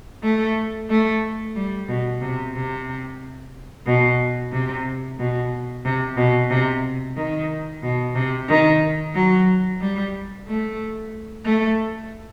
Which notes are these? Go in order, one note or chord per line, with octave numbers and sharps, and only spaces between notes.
A3
A3
G3
B2
C3
C3
B2
C3
B2
C3
B2
C3
D#3
B2
C3
D#3
F#3
G3
A3
A3